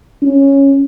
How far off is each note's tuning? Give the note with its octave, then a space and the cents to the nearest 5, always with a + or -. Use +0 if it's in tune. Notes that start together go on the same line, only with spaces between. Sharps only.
C#4 -5